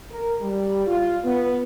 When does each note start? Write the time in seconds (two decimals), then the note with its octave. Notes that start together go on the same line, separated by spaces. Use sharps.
0.10 A#4
0.41 G3
0.87 F4
1.24 B3